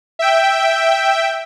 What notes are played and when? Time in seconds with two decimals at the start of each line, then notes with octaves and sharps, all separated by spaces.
0.19 E5 G5